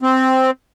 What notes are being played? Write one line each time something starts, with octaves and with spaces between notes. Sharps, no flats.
C4